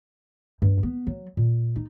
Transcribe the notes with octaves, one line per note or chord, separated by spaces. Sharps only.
G2
B3
F#3
A#2
D#4